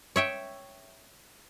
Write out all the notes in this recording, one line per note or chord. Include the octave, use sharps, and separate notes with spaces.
C#5 E5 G5